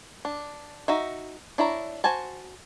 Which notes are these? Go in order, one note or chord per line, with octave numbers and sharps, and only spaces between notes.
D4
D#4 F#4 E5
D4 E4 C#5 A#5
F#4 C5 G#5 A5